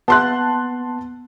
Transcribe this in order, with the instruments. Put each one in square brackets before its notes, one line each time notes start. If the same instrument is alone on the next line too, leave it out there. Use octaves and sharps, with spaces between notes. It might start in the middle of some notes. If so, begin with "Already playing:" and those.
[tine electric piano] B3 [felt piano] A5 C6 F#6